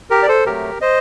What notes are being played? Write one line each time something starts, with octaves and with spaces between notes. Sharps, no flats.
G4 A#4
D5
A4 C5
C3 F#3 A3 G4 A#4
C5 D#5